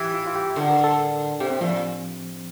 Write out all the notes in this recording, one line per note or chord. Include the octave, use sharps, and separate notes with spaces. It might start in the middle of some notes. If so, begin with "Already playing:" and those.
Already playing: E3 G4
F4
F4
G4
D3 A4
A#4
A4
C3 G4
C4
A#2 F3